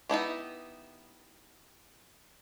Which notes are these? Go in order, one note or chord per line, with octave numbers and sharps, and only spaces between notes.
B3 D#4 E4 G4